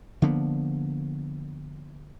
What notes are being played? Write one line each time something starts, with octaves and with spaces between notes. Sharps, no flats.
D3 F3 A#3 B3